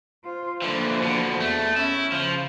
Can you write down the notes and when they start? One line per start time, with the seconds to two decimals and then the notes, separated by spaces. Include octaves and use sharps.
0.24 F4 C5
0.62 D3 E3 F3 A#3
1.02 B2 D3
1.40 E2 A3
1.76 C#4 E4
2.12 C#3 F3